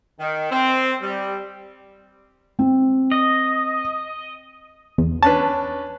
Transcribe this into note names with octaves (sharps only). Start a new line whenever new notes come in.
D#3
C4
G3
C4
D#5
E2
C#4 D4 B4 A5